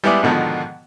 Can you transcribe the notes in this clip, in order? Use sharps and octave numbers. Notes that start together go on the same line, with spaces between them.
G3 G#3 B3 E4 G#4 D5
G#2 B2 D3 D#3 F3